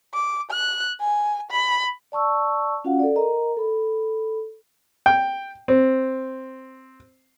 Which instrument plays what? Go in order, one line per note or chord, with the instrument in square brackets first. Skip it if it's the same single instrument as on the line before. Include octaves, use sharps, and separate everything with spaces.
[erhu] D6
F#6
G#5
B5
[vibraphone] D5 A5 C#6 E6
C#4 F4 F#4 F5 F#5
A4 D5
A#4 D#5 A#5
A4 B5
[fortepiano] G5
C4